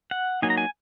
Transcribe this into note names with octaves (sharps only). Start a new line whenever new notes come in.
F#5
F#3 A#3 D#4 G#5
A#5
G#5